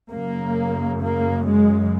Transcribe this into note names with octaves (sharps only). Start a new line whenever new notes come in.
F#2 C#3 A#3
A#3
G#3